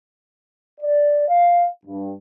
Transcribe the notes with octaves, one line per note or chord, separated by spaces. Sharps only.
D5
F5
G2